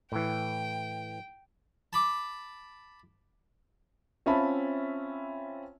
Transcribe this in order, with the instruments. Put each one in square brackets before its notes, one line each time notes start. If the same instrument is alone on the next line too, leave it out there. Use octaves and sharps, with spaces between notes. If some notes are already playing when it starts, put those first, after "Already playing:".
[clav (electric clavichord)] A2 E3 [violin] G5
[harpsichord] A5 B5 D6
[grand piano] C4 C#4 F4 E5 A5 B5